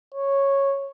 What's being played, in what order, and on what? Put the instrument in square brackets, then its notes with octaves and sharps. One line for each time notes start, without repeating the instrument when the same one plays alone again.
[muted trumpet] C#5